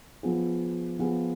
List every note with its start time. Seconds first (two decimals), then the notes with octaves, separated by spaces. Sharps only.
0.23 F3 B3 F4 G#4
0.99 F3 B3 F4 G#4